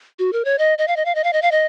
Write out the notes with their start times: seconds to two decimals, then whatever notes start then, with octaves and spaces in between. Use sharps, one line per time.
0.19 F#4
0.33 A#4
0.45 C#5
0.58 D#5
0.78 D#5
0.88 F5
0.96 D#5
1.05 F5
1.15 D#5
1.24 F5
1.33 D#5
1.42 F5
1.51 D#5